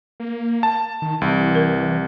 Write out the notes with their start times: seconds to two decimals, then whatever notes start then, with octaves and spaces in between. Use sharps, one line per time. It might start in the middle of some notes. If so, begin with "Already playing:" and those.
0.20 A#3
0.63 A5
1.02 D#3
1.21 C2 E3
1.55 A#4